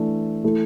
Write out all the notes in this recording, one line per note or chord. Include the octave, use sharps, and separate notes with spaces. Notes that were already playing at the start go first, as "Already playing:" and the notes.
Already playing: E3 A3 D4
E3 A3 E4 A4